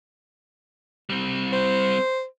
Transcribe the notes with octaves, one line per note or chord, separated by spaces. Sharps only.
G3 C4
C5